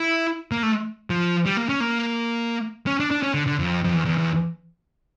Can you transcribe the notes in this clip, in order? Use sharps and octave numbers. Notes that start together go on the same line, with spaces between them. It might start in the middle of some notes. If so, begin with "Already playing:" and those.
Already playing: E4
A#3
A3
F3
G3
A#3
C#4
A#3
C#4
D4
D4
C#4
D3
D3
F2
F2
E2
E2
E2